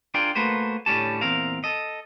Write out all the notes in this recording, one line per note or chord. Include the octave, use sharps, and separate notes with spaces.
D4 F4 G#4 A#4 G5
A3 A#3 F#4 B4 C5
D2 A2 G3 C#4 G4 A5
E2 A#2 C4 A#4 F5
A4 D#5